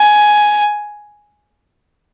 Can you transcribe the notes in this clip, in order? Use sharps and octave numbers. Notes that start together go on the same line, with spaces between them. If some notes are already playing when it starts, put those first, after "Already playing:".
Already playing: G#5